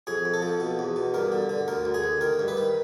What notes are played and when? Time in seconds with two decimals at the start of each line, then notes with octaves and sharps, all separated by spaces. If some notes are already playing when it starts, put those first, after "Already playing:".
0.07 F2 G#4
0.25 F2
0.34 A4
0.42 F3
0.60 B2
0.79 E2
0.96 B2
1.14 G2 A#4
1.32 D3
1.49 D3
1.68 D2 A#4
1.85 D2
1.94 G#4
2.04 D2
2.21 D#3 A#4
2.39 G2
2.48 B4
2.57 D#3